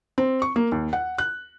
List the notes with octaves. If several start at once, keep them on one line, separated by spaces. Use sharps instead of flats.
C4
C#6
A#3
D#2
F#5
F#6